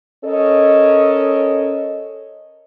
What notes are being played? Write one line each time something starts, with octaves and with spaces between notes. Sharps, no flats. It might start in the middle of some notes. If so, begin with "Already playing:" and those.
C#4 A4 A#4 C#5 D#5